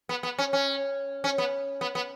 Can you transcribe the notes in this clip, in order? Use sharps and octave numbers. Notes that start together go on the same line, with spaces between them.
B3
B3
C#4
C#4
C#4
B3
B3
B3